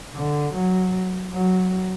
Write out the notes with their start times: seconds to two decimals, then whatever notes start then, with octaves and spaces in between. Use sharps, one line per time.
0.15 D3
0.54 F#3
1.34 F#3